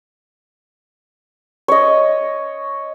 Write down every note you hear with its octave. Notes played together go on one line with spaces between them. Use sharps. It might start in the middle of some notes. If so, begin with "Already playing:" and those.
C#5 D#5